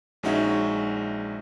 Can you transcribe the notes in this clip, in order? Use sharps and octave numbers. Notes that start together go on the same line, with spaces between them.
A#1 G#3 C#4 D#4 F#4 E5